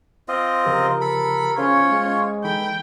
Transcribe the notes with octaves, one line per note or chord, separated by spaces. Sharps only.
C4 F4 D#5
C#3 F3 G4 A#4
A4 B5
C#3 C#4 F4 C5 C#5
G#3
E3 D#4 A4 G5 B5